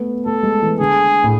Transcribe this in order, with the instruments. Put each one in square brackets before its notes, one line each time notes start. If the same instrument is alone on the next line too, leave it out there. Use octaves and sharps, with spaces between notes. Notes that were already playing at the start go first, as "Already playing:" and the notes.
Already playing: [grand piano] A3 B3
[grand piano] A3 [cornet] A4
[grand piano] G#3
E3
[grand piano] D3 [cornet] G#4
[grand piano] A2